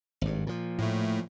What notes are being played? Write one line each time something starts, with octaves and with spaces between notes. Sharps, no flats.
G#1 G2
A#2 F3
A2 A3